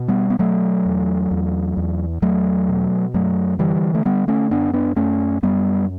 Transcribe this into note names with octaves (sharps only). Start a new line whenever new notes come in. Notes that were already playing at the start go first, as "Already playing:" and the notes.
Already playing: B2
G3 B3
B3
B2 F#3 A3
E2
E2
E2
E2 F#3 A3
B2
F#2 F#3 A3
D3 E3 G3
A3
D3 G3 B3
A3 C#4
F#2 B3 D4
B3 D4
F#2 A3 C#4
F#2 G3 B3